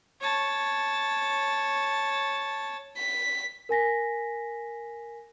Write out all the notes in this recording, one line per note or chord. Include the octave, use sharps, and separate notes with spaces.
C#5 A5
B6
A#4 G#5 A#6 B6